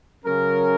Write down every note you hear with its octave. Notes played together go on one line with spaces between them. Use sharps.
C#3 F#3 C#4 A#4